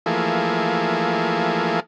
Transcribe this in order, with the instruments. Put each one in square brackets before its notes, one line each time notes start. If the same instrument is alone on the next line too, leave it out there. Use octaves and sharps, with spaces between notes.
[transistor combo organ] E3 F3 A3 A#3 G#4